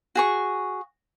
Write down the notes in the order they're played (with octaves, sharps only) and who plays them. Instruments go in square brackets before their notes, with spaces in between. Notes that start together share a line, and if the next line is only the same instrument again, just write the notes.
[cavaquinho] F#4 G#4 C#6